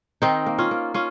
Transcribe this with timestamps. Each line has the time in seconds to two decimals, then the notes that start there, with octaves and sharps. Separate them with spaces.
0.22 D#3 C4 D#4
0.46 A#3
0.58 C#4 F4
0.71 A#3
0.94 C#4 F4